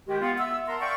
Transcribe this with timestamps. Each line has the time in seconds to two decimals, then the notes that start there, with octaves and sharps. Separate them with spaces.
0.08 D#3 G#3 G4
0.21 B3 F4
0.38 B3 E5 E6
0.68 A#4 F#5 A5 A#5 C6
0.81 D5 E5 F5 G5 C#6